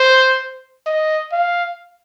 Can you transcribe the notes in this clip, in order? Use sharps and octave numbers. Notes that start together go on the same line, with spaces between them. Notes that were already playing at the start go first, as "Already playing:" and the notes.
Already playing: C5
D#5
F5